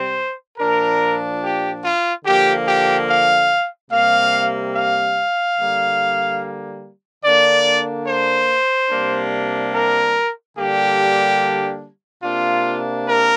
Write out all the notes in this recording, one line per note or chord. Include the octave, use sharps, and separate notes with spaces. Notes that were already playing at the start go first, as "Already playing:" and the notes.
Already playing: C3 G3 C4 C5
A#2 F3 D4 A#4
G4
F4
D3 F3 A#3 G4
G4
F5
C3 G3 A#3 F5
F5
D3 G3 A#3
D3 A#3 D4 D5
C5
C3 G3 A#3 D4
A#4
D3 G3 A#3 D4 G4
C3 A#3 D4 F4
A#4